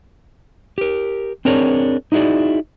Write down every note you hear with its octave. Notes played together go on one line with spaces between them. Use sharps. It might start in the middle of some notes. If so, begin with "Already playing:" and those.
G4 A#4
C4 D4 G#4 A#4 C#5
D#4 E4 F#4 G#4 D5